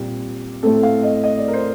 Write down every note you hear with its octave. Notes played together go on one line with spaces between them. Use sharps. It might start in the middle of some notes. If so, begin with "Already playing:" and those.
Already playing: A#2 G3 C4
A2 A3 C4 A4
F5
D#5
D#5
D5
A#4
C5